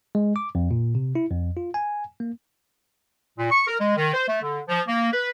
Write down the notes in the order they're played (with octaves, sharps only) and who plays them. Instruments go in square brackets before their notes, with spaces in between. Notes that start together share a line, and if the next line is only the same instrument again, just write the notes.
[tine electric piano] G#3
D6
F2
A#2
C3
E4
F2
F4
G#5
A#3
[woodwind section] A#2
C#6
A#4
G#3
D#3
C5
A3
D3
F3
A#3
B4